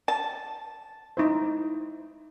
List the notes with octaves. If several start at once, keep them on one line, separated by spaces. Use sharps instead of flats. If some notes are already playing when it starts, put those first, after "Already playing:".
A5
D#4 E4 C5